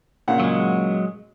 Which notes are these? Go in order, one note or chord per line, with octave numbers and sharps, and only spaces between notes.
A#2 C#3 F#5
F#3 G#3